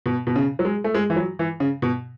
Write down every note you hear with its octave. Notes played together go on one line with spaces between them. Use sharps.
B2
B2
C#3
F#3
G#3
A3
G#3
E3
F#3
E3
C#3
B2